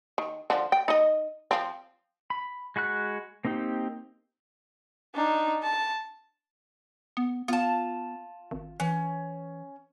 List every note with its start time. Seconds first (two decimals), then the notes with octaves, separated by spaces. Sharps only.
0.18 D#3
0.50 D3 F3
0.72 G5
0.88 D#4 D#5
1.51 F3 C4
2.30 B5
2.76 G#3 F#4 B5 F#6
3.45 A#3 C4 D#4 G4
5.15 D4 D#4
5.63 A5
7.17 B3
7.48 B3 F4 A5
8.51 G#1
8.80 E3 C#4